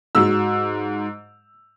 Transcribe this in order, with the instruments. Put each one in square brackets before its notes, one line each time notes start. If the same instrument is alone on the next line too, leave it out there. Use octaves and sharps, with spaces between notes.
[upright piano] G#2 F#3 E6